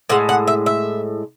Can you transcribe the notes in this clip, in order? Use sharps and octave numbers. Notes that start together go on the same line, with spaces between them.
A2 G#3 F#5
F#5
E5
E5